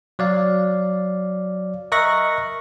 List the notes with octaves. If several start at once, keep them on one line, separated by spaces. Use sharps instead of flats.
F#3 D5 F5
A#4 D#5 E5 C#6 F#6 A#6